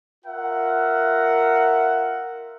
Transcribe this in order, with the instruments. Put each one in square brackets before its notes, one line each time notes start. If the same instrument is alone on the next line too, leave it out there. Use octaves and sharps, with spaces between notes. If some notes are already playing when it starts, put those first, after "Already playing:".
[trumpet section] F4 A#4 E5 F#5